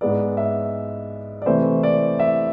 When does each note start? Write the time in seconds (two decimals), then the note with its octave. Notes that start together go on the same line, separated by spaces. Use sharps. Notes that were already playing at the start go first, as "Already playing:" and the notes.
0.01 G#2 G#3 B3 D5
0.37 E5
1.42 D5
1.46 C3 E3 A3 C5
1.83 D5
2.20 E5